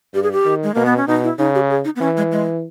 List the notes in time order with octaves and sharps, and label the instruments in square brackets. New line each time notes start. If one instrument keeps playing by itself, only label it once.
[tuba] G2 [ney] G4
[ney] G#4
G4
[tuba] D#3
[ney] G#3
[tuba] B2 [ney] A#3
[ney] B3
C#4
[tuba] B2 [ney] D#4
[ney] E4
[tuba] C#3 [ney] D#4
[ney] G4
G#4
D#4
B3
[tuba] E3 [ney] C#4
[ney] G#3
G#3